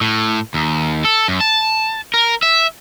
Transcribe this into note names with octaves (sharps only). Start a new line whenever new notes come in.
A2
D#2
A4
F#2
A5
A#4
E5